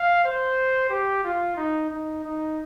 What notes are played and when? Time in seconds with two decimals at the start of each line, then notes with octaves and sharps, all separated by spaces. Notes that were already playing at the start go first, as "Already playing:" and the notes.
Already playing: F5
0.24 C5
0.90 G4
1.24 F4
1.57 D#4
1.90 D#4
2.24 D#4